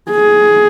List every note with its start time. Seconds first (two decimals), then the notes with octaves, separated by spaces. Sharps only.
0.11 G#4